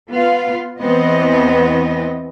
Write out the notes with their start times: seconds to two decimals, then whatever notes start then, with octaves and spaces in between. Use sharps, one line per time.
0.11 B3 F4 F5
0.79 E2 E3 B3 C4 D#5